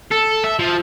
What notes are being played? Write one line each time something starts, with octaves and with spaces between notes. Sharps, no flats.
A4
E5
F3